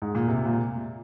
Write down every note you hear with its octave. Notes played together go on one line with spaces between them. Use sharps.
G#2
A#2
C3
A#2